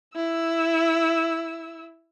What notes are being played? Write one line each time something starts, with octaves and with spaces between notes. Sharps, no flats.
E4 E6